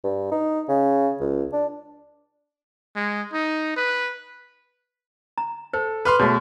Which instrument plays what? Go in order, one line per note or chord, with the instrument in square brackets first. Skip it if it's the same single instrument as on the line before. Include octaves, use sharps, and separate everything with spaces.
[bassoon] G2
D#4
C#3
C#2
D4
[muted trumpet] G#3
D#4
B4
[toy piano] A#5
[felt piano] A4 [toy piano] C5
[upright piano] B4 C6 [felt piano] D6 F6
[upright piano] B2 [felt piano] A3 G#4 [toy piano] F#4 C#5